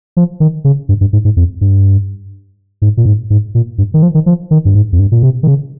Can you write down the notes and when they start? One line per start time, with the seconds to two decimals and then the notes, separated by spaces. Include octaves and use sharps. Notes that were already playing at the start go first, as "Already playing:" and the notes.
0.17 F3
0.40 D#3
0.64 C#3
0.89 G2
1.01 G2
1.13 G#2
1.25 G#2
1.36 F2
1.61 G2
2.82 G#2
2.97 A#2
3.05 G#2
3.30 G#2
3.55 A#2
3.78 G2
3.94 D#3
4.03 F3
4.15 D#3
4.26 F3
4.51 D#3
4.65 G2
4.74 G#2
4.93 F2
4.99 G2
5.12 A#2
5.23 C3
5.43 D#3
5.47 C#3